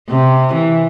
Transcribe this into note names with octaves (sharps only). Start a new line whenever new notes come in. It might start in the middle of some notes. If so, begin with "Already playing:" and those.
C3
E3